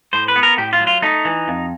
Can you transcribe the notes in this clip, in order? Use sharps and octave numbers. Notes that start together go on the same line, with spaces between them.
A2 C5
B4
B3
A#4
A2 G4
F4
F#3
F4
A3 D#4
E3
F2